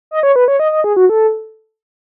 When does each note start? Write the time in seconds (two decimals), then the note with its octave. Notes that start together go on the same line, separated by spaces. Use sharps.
0.11 D#5
0.23 C#5
0.36 B4
0.48 C#5
0.60 D#5
0.72 D#5
0.84 G#4
0.96 F#4
1.09 A4